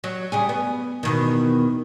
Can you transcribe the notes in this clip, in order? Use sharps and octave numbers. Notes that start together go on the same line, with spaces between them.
F#3
C#3 G3 G#4
B3
E2 B2 D#3